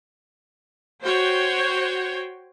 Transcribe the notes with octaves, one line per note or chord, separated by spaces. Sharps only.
F#4 C5 C#5 G5